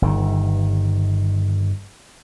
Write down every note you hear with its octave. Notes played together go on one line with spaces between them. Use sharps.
G1 D#3